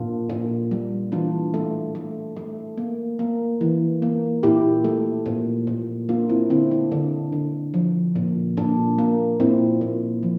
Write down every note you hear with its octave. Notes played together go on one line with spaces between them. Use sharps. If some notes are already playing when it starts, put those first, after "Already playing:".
Already playing: A#2 D4 F4
A#2
G3
E3 D4 F4
A3
A3
A3
A#3
A#3
E3
A#3
A#2 E4 G4
A3
A#2
A#2
A#3 D4 F4
C4 E4
D3 C4 E4
D4
D3 D4
D3
F3
A#2
A#2 D4
A#3
A#2 C4 E4
A#2
F3